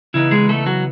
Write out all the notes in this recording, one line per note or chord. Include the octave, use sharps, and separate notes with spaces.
C#3 E3 B3 D#4 E4
G#3 G#4
A3 A4
F#3 F#4